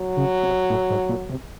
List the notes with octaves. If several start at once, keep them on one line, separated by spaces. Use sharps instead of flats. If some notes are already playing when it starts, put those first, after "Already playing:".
Already playing: F#3
C#3
C3
A2
G#2
A#2
C3